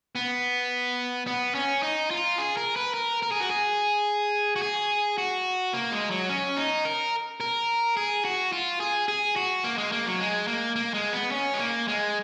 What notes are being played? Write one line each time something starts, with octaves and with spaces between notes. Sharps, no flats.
B3
B3
C#4
D#4
F4
G#4
A#4
B4
A#4
A#4
G#4
F#4
G#4
F#4
G#4
F#4
A#3
G#3
F#3
C#4
D#4
A#4
A#4
G#4
F#4
F4
G#4
G#4
F#4
A#3
G#3
A#3
F#3
G#3
A#3
A#3
G#3
B3
C#4
G#3
A#3
G#3